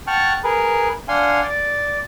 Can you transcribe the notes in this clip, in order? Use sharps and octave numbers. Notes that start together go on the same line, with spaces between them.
F#5 G5 A5 C#6 F6 F#6
G#4 A#4 B4
D4 F5 F#5 G#5 C6
D5